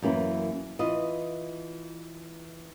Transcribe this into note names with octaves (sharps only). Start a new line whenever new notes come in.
F#2 E3 A#3 E4
E3 F4 B4 D#5